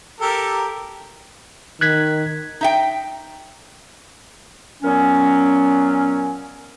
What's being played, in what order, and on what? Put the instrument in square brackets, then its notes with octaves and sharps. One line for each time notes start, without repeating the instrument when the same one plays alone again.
[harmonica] G4 A4 A#4
[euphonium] D#3 [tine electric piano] F#6 G#6 B6
[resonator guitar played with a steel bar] D#4 E5 G5
[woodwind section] A#2 F#3 B3 C#4